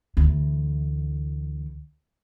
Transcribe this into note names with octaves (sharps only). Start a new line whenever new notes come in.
D2 E3